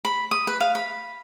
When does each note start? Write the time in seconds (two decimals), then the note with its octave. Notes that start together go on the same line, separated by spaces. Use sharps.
0.05 B5
0.31 D#6
0.47 B4
0.60 F5
0.75 B5